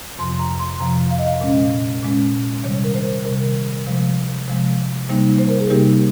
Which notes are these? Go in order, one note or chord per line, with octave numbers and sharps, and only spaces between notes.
F2 C3 F3 C6
A#5
C6
F2 C3 F3 A#5
F5
D#5
F5
A#2 G#3 C#4
A#2 G#3 C#4
C3 D#3 G3 C#5
A#4
C5
C3 D#3 G3 A#4
C3 F3 G#3
C3 F3 G#3
C3 G3 A#3 D#4
C5
A#4
G#4
C3 G3 A#3 D#4 G4